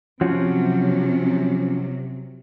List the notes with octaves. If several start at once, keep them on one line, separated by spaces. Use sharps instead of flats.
C3 F3 F#3 C#4 F#4